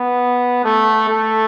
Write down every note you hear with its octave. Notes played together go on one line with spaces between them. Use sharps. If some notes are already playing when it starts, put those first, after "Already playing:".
Already playing: B3
A3
A3